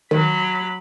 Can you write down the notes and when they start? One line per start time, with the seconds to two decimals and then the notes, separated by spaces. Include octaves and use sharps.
0.11 D#3 F#3 B5